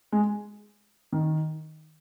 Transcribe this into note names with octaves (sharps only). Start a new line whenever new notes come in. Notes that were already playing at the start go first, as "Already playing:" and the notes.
G#3
D#3